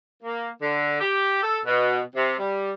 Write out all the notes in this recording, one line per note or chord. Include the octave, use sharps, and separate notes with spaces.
A#3
D3
G4
A4
B2
C3
G3